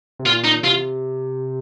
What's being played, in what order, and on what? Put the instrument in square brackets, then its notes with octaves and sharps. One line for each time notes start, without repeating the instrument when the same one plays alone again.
[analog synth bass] C3
[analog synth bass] A#2 [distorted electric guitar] F4
[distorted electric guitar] D#4
[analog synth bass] C3 [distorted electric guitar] F4